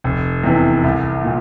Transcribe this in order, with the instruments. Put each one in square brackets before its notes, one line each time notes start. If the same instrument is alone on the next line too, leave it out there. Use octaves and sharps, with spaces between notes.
[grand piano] F1
E2 C3 E3
C2
A#2